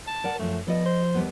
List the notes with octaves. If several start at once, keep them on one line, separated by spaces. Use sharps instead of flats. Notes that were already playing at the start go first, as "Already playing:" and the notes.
A5
A#4 D5 F#5
F#2 F3 A3
F3 B3 A4 D5 D#5
C5
D#2 G3 B3